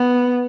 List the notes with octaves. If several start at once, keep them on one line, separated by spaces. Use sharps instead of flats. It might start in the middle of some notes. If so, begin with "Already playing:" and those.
Already playing: B3